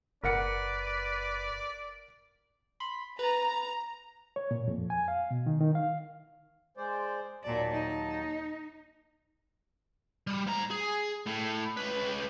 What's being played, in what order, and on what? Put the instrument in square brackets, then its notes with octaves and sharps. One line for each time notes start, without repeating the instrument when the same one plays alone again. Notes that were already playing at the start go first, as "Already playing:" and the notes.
[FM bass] F#1 [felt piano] A#4 F#5 C#7 [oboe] B4 [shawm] D5
[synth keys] B5 C6
[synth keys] B4 A6 [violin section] A#5
[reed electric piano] C#5
A#2
F2
G#5
F5
B2
D#3
D#3
F5
[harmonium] G#3 C5 D5
[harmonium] D#2 F#3 A5 [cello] A#2 D5
[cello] D#4
[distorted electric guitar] G3
G#2 A#5
G#4
A2
C#2 B4